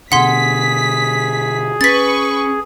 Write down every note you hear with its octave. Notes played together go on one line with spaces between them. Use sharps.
B2 D3 G#4 F#5 C6 B6
C#4 B4 C#6 A6 B6